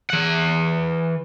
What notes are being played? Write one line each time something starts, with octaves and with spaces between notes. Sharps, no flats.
E3 F#5